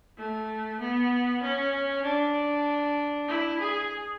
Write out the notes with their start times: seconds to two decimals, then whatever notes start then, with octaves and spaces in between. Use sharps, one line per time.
0.17 A3
0.80 B3
1.43 C#4
2.04 D4
3.28 E4
3.60 G#4